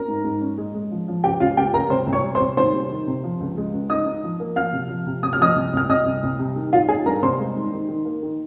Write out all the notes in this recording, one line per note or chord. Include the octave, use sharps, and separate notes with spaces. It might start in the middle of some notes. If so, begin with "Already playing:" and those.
Already playing: C#4 A#4 A#5
G#2
G#2
C#4
G#3
G#3
F3
F3
C#2 G4 G5
C#2 F4 F5
C#2 G4 G5
C#2 A#4 A#5
C2 C5 C6
C2
C#5 C#6
G3
C5 C6
C2
D#3 C5 C6
C3
D#3
C3
F3
C#2
G#3
C#2
D#4 D#5 D#6
D#4
F3
A#3
F3 F5 F6
C3
F3
C3
C3 D#6
F6
F3 D#5 D#6
C2
C2 F6
C2 D#5 D#6
C2
C2
C3
D#3
D#4 F4 F5
D#4 G#4 G#5
G2 A#4 A#5
C3 C5 C6
G#3
D#3
D#3
D#3
A#3
D#3